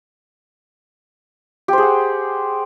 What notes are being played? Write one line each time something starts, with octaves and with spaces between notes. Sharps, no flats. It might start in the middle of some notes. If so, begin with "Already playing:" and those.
G4 G#4 C5 F#5